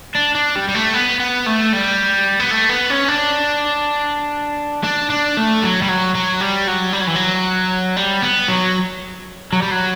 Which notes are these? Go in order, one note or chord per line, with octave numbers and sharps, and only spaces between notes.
D4
D4
G3
G3
A3
B3
B3
A3
G3
B3
A3
B3
C#4
D4
D4
D4
A3
F#3
G3
F#3
F#3
G3
F#3
G3
F#3
E3
F#3
G3
B3
F#3
F#3
G3
F#3